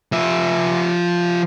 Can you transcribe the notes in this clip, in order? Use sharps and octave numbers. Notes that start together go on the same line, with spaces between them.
F3 E5